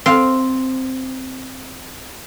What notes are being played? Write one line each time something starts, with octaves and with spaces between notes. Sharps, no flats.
C4 F5